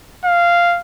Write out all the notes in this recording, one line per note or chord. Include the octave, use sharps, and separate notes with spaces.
F5